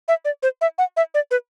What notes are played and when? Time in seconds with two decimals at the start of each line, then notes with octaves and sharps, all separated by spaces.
0.08 E5
0.25 D5
0.43 C5
0.61 E5
0.78 F#5
0.97 E5
1.14 D5
1.31 B4